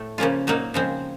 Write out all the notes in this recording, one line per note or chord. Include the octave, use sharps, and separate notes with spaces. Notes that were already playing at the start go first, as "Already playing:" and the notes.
Already playing: A2 A3
C#3 F3 A#3 C#4 F4
A#2 F#3 A#3 D#4
C#3 F3 G#3 C4